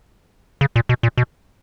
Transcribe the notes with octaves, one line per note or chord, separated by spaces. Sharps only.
C#3
A#2
B2
A#2
B2